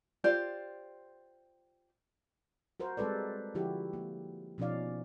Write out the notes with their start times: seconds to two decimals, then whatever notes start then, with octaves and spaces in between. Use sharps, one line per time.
0.24 F4 G4 C5 D5
2.80 F#4 A#4 C5
2.97 G3 G#3 C4 A4 B4 D5
3.55 D3 F3 E4 F#4 G4
3.93 A#3
4.58 B2 F3 C#4 D#4 D5 F5